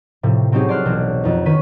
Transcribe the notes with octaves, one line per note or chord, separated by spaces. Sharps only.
A2 C3 F3
F#3 C4 C#4 D#4 G4 G#4
D5 A5 C6 F6 F#6
E1 B1 C4
F2 D#4
D#3 C#4 B4 B6 D#7